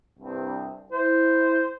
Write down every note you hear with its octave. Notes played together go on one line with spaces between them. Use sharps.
C2 G2 C4
E4 C5